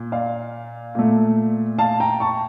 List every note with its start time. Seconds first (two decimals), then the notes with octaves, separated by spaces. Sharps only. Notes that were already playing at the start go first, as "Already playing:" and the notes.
Already playing: A#2
0.12 D5 F5
0.95 A#2 A3
1.78 F5 A5
2.00 G5 A#5
2.20 A5 C#6